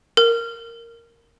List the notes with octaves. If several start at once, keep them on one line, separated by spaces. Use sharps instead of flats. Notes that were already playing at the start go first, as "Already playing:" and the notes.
A#4